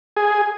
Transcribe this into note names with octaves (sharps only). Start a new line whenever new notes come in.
G#4